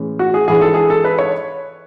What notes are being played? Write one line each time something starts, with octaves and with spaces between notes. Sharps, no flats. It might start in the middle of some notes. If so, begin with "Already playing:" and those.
Already playing: A2 E3 G#3 C#4
F#4
G#4
G#2 E3 G#3 D4 G#4
A4
G#4
A4
B4
C#5